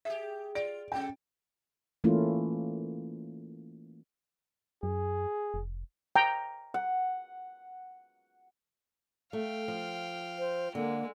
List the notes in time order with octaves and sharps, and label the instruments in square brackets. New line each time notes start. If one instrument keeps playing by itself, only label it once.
[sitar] G4 G#4 [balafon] E5
[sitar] F4 [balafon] D5 [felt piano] D7
[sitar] C3 F#3 A4 [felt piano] C#4 G5
[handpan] E3 A3 A#3 C#4 E4 F4
[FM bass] F#2 [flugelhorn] G#4
[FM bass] F1
[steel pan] G5 A#5
[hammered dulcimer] F#5
[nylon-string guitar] A3 [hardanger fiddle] F5 G5
[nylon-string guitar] F3
[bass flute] C5
[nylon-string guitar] D3 [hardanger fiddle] G#3 [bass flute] A#3